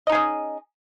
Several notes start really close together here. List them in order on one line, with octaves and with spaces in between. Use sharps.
D#5 D#4 G#4 C#4